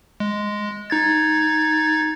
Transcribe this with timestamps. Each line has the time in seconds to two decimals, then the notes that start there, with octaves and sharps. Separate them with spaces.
0.20 G#3
0.90 D#4 G#6 A6